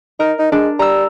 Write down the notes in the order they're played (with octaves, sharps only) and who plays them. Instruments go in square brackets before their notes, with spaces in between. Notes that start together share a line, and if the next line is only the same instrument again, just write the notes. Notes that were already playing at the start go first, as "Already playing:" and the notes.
[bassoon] D#4 [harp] A#4
[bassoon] D#4
[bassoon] G#3 [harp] D4
[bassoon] G3 [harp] A#5 E6